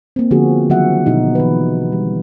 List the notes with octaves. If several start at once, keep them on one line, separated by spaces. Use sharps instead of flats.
A#3 C4
D3 F3 B3 F#4 G#4
D#3 F3 F#3 F#4 E5 F#5
B2 D#4 E4
E3 B4
G3